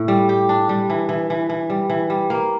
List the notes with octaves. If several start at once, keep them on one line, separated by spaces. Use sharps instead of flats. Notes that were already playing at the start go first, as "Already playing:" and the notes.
Already playing: A2
G3
G4
D4
G3
E3
E3
E3
E3
G3
E3
G3
A#3